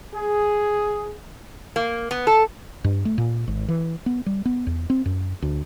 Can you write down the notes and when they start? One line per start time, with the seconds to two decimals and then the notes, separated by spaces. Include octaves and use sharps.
0.14 G#4
1.76 A#3
2.11 B3
2.27 A4
2.84 G2
3.05 A3
3.18 A#2
3.48 G#1
3.68 E3
4.06 B3
4.26 G3
4.45 B3
4.67 E2
4.90 C4
5.06 F#2
5.42 D2